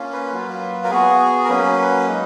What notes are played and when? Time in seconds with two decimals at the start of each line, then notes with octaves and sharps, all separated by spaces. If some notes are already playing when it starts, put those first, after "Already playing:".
Already playing: A#3 C#4 F4
0.13 B4
0.33 F#3 A#3 F4
0.84 A#4
0.90 B3 F#4 G#4
1.45 A#4
1.49 F#3 A#3 C#4 B4
2.07 G#3 D#4